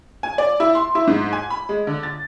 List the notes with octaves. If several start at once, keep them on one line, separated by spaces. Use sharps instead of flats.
G#5
D5
E4
C6
E4
G#2
G#5
B5
G#3
D3
A6